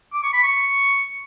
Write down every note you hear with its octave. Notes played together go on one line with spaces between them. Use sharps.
D6
C#6
B5
C#6